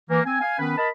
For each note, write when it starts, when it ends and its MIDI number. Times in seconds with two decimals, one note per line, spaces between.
0.10 0.20 52
0.10 0.20 58
0.25 0.37 60
0.25 0.37 80
0.40 0.57 77
0.40 0.57 80
0.59 0.75 51
0.59 0.75 59
0.59 0.75 61
0.59 0.75 71
0.77 0.89 70
0.77 0.89 75
0.77 0.89 81
0.77 0.89 83